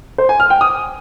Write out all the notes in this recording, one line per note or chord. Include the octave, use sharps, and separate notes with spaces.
C5
G#5
F6
G5
D#6